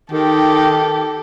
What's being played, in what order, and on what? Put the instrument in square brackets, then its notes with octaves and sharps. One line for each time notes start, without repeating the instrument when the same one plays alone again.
[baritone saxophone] D#3 [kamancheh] G4 A4